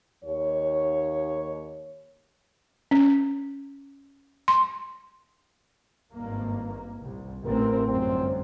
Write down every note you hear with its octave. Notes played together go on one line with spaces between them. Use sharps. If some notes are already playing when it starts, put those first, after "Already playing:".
D#2 C#5
C#4
C6
G#1 G2 A#3
C2
A1 C3 C4 A#4
G1 F#2 C4